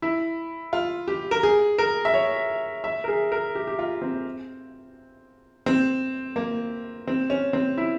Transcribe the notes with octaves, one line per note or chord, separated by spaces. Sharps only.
E4
F4
G4
A#4
G#4
A#4
E5
C#5
E5
A#4
G#4
A#4
G4
G4
F4
C4
C4
A#3
C4
C#4
C4
E4